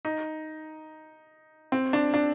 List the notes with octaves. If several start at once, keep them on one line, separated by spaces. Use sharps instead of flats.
D#4
C4
D4
D4